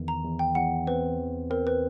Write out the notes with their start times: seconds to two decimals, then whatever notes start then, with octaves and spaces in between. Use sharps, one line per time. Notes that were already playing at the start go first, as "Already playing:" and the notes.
Already playing: E2 D#3
0.08 A#5
0.24 E2
0.39 G5
0.55 E2 F#5
0.87 C4 B4
1.19 E3
1.50 C4 A#4
1.67 B4